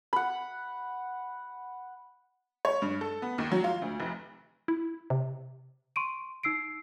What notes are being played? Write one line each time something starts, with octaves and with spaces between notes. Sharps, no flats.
F#5 B5
C#5
G2
A4
B3
D#2
F#3
F4
D2
F1
E4
C3
C6 C#6 D7 D#7
D#4 E6 C7 D7